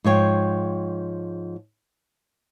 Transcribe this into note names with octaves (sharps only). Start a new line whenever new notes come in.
G#2 F3 C#5 G5